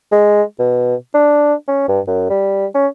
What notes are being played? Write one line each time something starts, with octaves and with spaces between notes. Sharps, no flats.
G#3
B2
D4
C#4
G2
F#2
G3
C#4